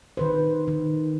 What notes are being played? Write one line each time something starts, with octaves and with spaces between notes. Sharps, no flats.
D#3 B4 C5
D#3